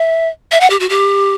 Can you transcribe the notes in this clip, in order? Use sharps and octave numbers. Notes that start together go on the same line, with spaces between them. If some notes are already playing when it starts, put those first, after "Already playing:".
Already playing: E5
E5
F#5
G4
F#4
G4